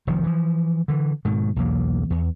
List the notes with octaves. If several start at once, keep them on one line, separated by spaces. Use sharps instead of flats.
F1 D#3 F3
E3 F3
D3 E3
G#2 B2 D#3
B1 E2 A#3
E2